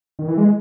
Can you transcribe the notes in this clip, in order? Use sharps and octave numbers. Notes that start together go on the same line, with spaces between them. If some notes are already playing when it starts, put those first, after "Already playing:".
D#3
E3
G#3